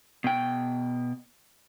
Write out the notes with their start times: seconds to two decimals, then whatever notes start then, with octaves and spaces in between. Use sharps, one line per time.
0.24 B2 G5